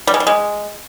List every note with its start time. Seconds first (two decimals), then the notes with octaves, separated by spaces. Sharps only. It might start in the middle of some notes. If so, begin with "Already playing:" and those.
0.07 G3
0.14 G#3
0.20 G3
0.27 G#3